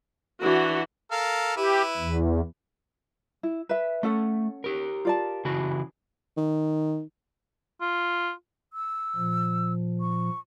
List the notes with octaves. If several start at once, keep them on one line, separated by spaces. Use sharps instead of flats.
E3 D4 F#4
A4 A#4 F5
E4 G4 B4
E2
E4
B4 E5
A3 C#4 A4 F#5
G4 A#4
F4 D5 A5
C#3 E3 F#4
D#3
F4
E6
A#2 F3
C#6